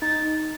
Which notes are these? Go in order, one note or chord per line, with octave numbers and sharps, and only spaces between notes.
D#4 A6